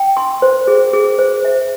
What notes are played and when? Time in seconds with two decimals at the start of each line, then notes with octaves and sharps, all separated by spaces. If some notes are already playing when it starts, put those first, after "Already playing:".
Already playing: G5
0.17 C6
0.42 C5
0.68 G#4
0.93 G#4
1.19 C5
1.45 E5